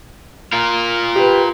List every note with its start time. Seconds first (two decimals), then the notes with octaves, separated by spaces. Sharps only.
0.53 F4 A#4
1.16 G4 B4